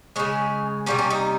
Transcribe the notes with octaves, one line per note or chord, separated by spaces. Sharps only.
C#3 G#3 C#4
C3 G3 A#3 C#4
C#4
D#4